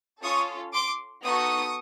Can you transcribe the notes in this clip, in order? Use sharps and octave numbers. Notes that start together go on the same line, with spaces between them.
C#4 F4 A4 C#6 D#6
C6 D6
B3 D#4 F#4 A4 C#6 D#6